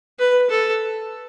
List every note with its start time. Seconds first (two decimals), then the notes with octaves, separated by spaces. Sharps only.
0.19 B4
0.50 A4